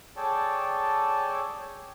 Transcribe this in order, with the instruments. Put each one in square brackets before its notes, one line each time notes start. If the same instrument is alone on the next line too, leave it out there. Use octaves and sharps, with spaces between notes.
[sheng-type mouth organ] G#4 A4 C#5 D5 G5 A5